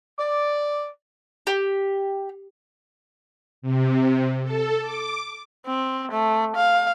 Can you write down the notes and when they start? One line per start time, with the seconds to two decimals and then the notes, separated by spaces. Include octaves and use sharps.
0.19 D5
1.47 G4
3.62 C3
4.43 A4
4.81 D6
5.66 C4
6.12 A3
6.56 F5